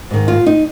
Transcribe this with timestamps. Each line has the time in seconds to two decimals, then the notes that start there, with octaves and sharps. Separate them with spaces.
0.11 G#2 D#3
0.28 F4
0.46 D#4